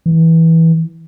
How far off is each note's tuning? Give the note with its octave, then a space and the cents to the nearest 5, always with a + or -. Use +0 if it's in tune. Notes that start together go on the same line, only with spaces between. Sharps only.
E3 -15